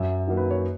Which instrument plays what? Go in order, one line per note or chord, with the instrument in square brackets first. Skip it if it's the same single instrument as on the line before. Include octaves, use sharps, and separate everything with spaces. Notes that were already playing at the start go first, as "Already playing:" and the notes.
Already playing: [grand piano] F#2 E5
D#3 F#3 A#3
B4
C#5